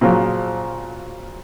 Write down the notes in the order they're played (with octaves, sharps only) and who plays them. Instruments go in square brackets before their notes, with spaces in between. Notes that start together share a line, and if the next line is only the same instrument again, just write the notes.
[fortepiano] A#2 C#3 F3 F#3